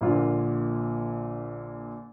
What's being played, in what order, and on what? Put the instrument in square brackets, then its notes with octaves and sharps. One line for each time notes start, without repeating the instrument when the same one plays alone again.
[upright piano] A#1 A#2 D3 F4